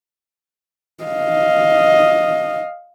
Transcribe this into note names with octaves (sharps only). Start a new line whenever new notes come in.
D#5 F5